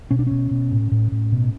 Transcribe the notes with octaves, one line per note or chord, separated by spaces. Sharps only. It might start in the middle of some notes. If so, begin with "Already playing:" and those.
B2 C#4
D4
B2 C#4
B2
A2
A2
A2
B2